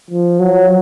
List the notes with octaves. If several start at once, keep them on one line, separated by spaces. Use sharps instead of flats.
F3
F#3